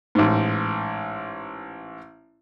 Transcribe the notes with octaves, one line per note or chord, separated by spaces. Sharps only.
A1 G#2